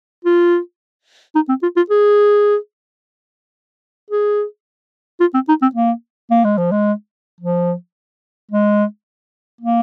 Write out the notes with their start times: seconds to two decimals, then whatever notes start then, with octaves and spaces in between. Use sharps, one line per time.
0.25 F4
1.35 D#4
1.49 C4
1.63 F4
1.77 F4
1.90 G#4
4.11 G#4
5.20 F4
5.34 C4
5.49 D#4
5.62 C4
5.75 A#3
6.30 A#3
6.44 G#3
6.58 F3
6.72 G#3
7.41 F3
8.51 G#3
9.61 A#3